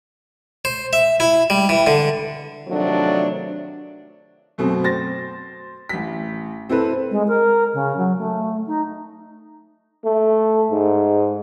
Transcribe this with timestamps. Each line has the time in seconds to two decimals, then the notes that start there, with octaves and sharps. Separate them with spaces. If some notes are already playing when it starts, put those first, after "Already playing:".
0.65 C5
0.93 E5
1.20 E4
1.50 G3
1.69 E3
1.87 D3
2.68 C3 D#3 F3 F#3 A3 D4
4.58 F#2 B2 A3 C4
4.84 C5 A6 A#6
5.89 A1 B6
6.69 C4 E4 A4 B4
7.11 G#3
7.28 A#4
7.74 C#3
7.97 F#3
8.18 A3
8.67 D#4
10.05 A3
10.71 G#2